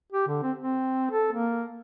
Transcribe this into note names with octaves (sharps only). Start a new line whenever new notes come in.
G4
D3
C4
C4
A4
A#3